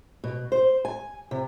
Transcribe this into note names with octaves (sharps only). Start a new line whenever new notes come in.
B2
C5
G#5
C3